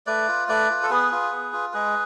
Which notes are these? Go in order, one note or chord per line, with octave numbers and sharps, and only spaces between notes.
A3 B4 D5
F4
A3 B4 D5
F4
A4
B3 G#4 B4
F4
B3
F4
G#3 G#4 B4